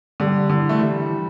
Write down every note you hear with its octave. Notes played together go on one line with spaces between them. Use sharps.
D3 G3
D3 E3
A3
E3 G3
E3